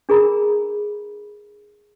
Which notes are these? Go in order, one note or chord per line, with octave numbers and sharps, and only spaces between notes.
D4 G#4 A#4 A#5 B5